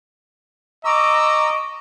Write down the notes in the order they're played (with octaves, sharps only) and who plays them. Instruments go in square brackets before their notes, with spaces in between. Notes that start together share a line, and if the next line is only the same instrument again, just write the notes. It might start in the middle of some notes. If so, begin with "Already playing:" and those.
[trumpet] D#5 [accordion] A#5 E6 [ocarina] C#6 [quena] D6